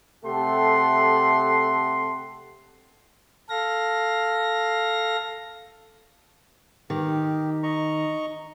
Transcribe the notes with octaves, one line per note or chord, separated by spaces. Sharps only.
C3 A3 G4 A4 F#5 C6
A4 F5 A#6
D#3 G4
D#5 A#5 C#6